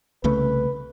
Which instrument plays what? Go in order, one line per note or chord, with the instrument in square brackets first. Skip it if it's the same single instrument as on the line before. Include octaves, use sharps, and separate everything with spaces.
[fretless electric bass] C2 C#3 A3 [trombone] B4